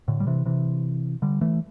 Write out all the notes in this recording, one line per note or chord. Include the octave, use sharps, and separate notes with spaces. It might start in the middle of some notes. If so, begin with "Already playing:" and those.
A2 D3
G3
C3 E3
C3 E3
D3 G3
E3 A3